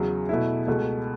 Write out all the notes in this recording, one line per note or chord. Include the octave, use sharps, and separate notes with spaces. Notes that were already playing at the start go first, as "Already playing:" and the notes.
Already playing: E2 C#3 F#3
B2 A3 E4
C#2 B2 A3